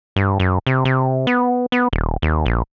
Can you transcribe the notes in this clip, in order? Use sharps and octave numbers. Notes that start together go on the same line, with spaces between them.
G2
F#2
C3
C3
B3
B3
D#1
D#2
A#1